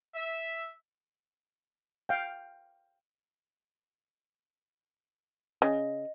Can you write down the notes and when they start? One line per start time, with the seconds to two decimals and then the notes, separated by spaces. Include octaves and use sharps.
0.14 E5
2.09 F5 G5
5.62 C#3 D#5